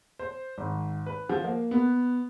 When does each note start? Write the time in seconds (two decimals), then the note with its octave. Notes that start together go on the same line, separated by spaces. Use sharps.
0.19 C5
0.58 G#1
1.06 B4
1.30 F3
1.44 A#3
1.71 B3